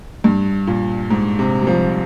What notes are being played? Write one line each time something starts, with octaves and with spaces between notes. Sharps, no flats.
G2
A#2
G#2
C3
G3
F3